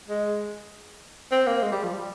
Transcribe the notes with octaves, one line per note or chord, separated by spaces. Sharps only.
G#3
C4
A#3
G#3
G3
F3
G3